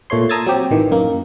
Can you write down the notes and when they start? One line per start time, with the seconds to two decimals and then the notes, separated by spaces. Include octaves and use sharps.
0.10 A#2 A3 C#5 C6
0.29 A5 A#5 D#6 E6 G#6 A6
0.46 F#3 C4 G4
0.71 A1 D#3 E3
0.91 F#2 A#3